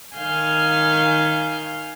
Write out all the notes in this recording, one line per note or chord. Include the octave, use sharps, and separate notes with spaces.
D#3 F5 G#5 F6 G6